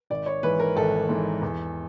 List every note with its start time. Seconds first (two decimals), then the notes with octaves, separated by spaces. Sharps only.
0.10 G#1 D5
0.26 C#5
0.43 G#2 E3 B4
0.60 A#4
0.76 G#1 A4
1.09 G#2 E3
1.42 E2